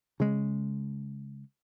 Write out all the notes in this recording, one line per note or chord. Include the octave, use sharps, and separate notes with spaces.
C#3 G#3